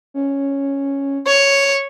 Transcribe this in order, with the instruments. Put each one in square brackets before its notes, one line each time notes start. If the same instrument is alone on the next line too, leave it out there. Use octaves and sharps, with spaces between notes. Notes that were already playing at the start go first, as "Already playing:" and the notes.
[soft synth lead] C#4
[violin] C#5